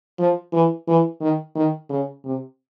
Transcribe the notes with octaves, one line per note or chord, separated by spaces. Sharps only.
F3
E3
E3
D#3
D#3
C#3
C3